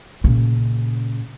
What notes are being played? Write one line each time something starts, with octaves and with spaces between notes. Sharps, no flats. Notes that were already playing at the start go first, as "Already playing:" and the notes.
A#2 C#3